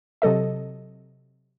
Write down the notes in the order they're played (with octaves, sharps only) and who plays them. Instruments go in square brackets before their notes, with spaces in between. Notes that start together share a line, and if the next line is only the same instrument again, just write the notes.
[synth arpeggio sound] C3 F#3 A4 D#5